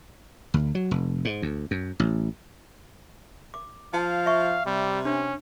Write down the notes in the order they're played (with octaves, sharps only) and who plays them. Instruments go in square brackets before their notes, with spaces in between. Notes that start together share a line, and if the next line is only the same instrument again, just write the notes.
[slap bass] D2
F#3
F1
G#2
D2
F#2
A1
[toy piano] D6
[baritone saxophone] F3 [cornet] F5 [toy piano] A5
[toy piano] E5 C#6
[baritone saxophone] C3 [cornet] G3
[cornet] C#4 [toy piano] D4